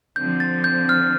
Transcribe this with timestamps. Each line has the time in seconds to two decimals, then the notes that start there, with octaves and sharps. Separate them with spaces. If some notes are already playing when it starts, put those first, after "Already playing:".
0.16 D3 F3 C4 G6
0.40 A6
0.64 G6
0.89 F6